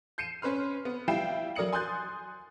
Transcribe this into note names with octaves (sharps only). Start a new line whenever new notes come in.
G6 C7 C#7 D#7 E7
C#4 B4 C6 F6
B3
G3 E4 F4 G5 C7 E7
F#3 A#4 D5 D#6 C#7 F#7
G#5 C6 D#6 F#6 G6 A6